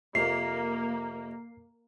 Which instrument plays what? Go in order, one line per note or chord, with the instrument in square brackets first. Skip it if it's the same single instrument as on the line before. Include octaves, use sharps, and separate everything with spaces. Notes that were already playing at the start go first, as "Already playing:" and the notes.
[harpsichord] F2 C3 [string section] A#3 [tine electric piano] C7